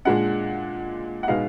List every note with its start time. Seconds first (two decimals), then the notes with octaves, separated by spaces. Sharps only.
0.05 A#2 G#3 D4 F#5
1.23 F#5
1.28 B2 G#3 D#4 F5